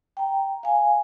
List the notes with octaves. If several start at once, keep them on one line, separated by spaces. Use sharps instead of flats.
G5 A#5
F5 G#5